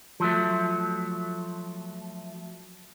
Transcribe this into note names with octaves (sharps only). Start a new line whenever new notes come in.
F3 F#3 A3